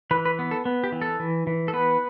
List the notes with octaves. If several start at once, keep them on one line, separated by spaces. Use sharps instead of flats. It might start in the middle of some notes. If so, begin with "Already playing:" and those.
E3 B4
B4
B3
A4
B3
G4
E3
A4
E3
E3
A4
B3 B4